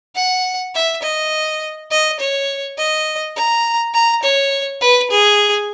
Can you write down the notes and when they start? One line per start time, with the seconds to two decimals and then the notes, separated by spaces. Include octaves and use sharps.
0.16 F#5
0.74 E5
1.02 D#5
1.91 D#5
2.20 C#5
2.77 D#5
3.35 A#5
3.94 A#5
4.22 C#5
4.81 B4
5.10 G#4